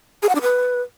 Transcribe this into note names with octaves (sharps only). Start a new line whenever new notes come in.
G#4
F#5
D4
B4